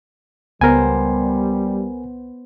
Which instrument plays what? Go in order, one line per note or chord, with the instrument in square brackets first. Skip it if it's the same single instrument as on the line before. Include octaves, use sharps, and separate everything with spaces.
[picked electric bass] C#2 [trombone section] G3 [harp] B3 C5 [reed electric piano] A#4 G#5